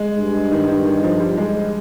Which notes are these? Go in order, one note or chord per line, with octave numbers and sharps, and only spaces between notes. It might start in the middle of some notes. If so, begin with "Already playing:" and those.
Already playing: G#3
G2
D#3
D#3
D#3
F3
G3
G#3